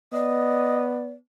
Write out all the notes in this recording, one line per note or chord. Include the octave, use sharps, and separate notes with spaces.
B3 D5 D#5